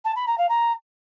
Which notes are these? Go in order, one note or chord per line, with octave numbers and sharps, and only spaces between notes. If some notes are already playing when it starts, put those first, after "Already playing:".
A5
B5
A#5
F5
A#5